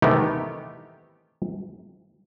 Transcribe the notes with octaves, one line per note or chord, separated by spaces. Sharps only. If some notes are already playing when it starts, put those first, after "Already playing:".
C3 D#3 E3 A3 B3 G4